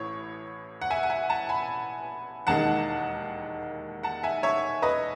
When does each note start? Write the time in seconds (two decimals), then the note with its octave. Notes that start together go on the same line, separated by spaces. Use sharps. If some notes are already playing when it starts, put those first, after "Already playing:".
Already playing: A1 A2 C#5
0.81 F#5
0.90 E5 G#5
1.03 F#5
1.10 E5 G#5
1.30 F#5 A5
1.49 G#5 B5
2.47 E1 D#2 D#3 G#3 F#5 A5
4.03 F#5 A5
4.23 E5 G#5
4.43 C#5 E5
4.82 B4 D#5